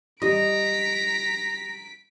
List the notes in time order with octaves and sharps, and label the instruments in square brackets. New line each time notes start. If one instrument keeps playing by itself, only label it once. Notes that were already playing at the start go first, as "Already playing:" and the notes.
[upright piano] G3 [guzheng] D#5 [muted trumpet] A#5 [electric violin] B6 D7